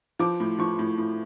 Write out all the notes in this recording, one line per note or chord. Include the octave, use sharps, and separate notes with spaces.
F3 D6
A2
F3 C#6
A2
A2